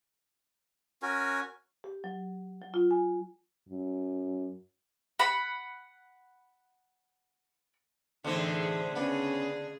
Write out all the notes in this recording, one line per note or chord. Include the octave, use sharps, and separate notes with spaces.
C#4 F#4 A#4 G#5
G4
F#3
F#3
F4
G#5
F#2
F#5 B5
E2 A2 D3 A3 C4 D#4 G#4
C#3 B3 C#4 D4 G#4